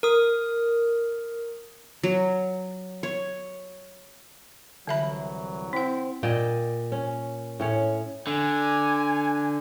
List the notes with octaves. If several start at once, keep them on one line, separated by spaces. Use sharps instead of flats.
A#4 D#6
F#3
C#5
C2 D3 E3 F#3 E5 B5
C4 E4 F#5
A#2 D5 D#5 G5
C#4
A2 C#4 C#5
D3 G#5